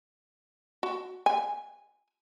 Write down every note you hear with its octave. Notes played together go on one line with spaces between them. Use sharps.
F#4
G#5